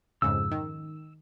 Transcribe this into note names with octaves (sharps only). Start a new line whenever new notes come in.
F2 G#2 C#3 E6
D#3